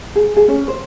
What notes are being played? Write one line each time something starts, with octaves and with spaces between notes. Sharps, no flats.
G#4
G#4
C#4
C5